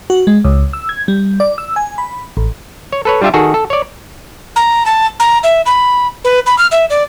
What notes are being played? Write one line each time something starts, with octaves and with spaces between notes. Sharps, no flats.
F#4
G#3
C#2
E6
G#6
G3
D5
E6
G#5
B5
A1
C#5
A4 B4 C#5
G3 D4 F4 G4 E5
D#3 F#4 G#4 A4
A4
C#5 D5
A#5
A5
A#5
E5
B5
B4
B5
F6
E5
D5